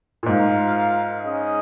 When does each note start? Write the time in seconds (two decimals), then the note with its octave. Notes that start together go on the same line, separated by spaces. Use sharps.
0.23 A#2
0.26 G#2 F4 A#4 F5
1.21 C#4 G#4 D#5